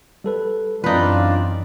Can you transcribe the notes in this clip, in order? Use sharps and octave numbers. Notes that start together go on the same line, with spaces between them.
G3 A4 B4
F#2 E3 C4 D4 D#4 F4 B4 D5